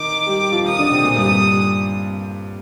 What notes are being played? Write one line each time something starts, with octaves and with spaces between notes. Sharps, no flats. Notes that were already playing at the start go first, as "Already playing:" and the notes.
Already playing: D#3 D#4 D6
G3 G4
G3 G4
F3 F4
D#3 D#4 D#6
D3 D4
C3 C4
A#2 A#3
G2 G3 D#6